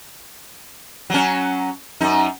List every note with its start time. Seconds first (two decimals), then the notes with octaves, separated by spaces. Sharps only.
1.10 F#3 C#4
2.01 F#2 D#4